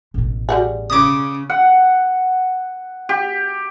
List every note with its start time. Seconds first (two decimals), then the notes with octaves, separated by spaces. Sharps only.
0.14 A1 B2
0.49 G3 F#4 G#4
0.90 C#3 D6 D#6
1.50 F#5
3.09 G4